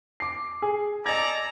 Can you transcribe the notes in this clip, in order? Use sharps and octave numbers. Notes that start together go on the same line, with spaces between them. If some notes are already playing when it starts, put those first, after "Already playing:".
D6 C7
G#4
A4 D5 D#5 G#5 A#5 G#6